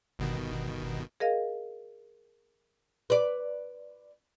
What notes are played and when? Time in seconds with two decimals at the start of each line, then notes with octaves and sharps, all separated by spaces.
0.19 G1 B2 D#3
1.20 G#4 A#4 D#5 F5
3.10 B4 D5